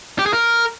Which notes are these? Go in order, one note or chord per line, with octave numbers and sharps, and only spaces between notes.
G4
G#4
A#4